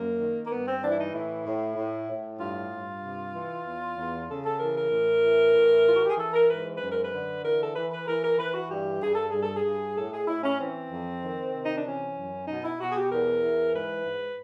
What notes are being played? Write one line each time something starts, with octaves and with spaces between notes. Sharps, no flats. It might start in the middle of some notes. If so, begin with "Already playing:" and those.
Already playing: F#2 A#3
D#3
A#3
G2 B3
C4
E3 D4
E4
D#4
A2 E4
A2
A2
A2
G2 F4
G2
C3
E3
E2
E2
C#3 A4
A4
E3 A#4
A#4
A2
E3
A2
E3 F4
F#4
G4
G#4
E3 A4
A#4
G#2 B4
F#2 B4
A#4
B4
D3
E3 A#4
A4
E3 B4
B4
E3 A#4
A#4
E3 B4
F#4
G2 G4
G2 G#4
A4
G2 G#4
A4
G#4
G2
A2 A4
G#4
A2 E4
C#4
E3 C4
F2
D#3
C3
D#4
D4
E3 C#4
F#2
B2 D#4
E4
B2 F#4
G#4
G4
E2 A#4
E3
G#2 B4
G#2